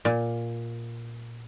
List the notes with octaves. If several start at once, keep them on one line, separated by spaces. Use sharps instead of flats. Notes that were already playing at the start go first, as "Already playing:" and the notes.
A#2